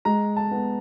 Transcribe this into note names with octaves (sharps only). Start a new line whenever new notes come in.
G#3 A#5
A5
B3